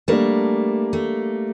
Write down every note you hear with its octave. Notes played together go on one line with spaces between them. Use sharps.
G3 A3 A#3 D4
A3